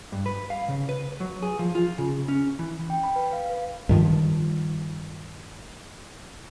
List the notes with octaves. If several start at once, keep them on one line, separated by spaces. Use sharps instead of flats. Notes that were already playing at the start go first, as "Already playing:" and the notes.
G2
B4
F5
C#3
B4
F#3
G#4
F3
F4
C#3
C#4
E3
G5
B5
B4
F5
B4
G2 D#3 F3